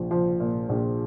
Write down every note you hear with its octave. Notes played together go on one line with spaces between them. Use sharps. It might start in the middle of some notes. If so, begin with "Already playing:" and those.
Already playing: A#1 F3
F3
A#2
A#1